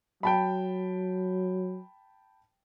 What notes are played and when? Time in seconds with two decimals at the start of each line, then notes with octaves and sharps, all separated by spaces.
0.23 F#3 G5 A5 B5